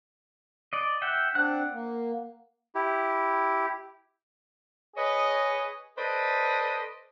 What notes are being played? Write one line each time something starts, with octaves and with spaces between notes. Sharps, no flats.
D5 D#5
E5 F#5 G5
C4 D4 F#5 F#6
A#3
E4 G4
G#4 B4 C#5 D#5
A4 B4 C5 D5 D#5